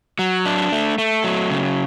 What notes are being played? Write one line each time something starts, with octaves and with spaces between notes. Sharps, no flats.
F#3
D4
A3
A3
F#3
C#3